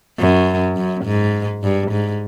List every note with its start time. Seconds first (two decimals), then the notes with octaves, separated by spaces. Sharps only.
0.19 F#2
0.77 F#2
1.05 G#2
1.63 G2
1.91 G#2